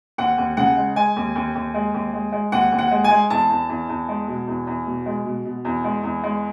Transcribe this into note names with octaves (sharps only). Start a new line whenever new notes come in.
D#2 F#5
D#2
C#3 F#5
G#3
G#3 G#5
D#2
D#2
D#2
G#3
D#2
G#3
G#3
D#2 F#5
D#2
F#5
G#3
G#5
G#3
E2 A5
E2
E2
E2
G#3
B2
E2
E2
B2
G#3
B2
B2
E2
G#3
E2
G#3